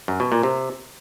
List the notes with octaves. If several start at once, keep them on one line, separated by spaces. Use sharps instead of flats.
F#2
B2
A#2
C3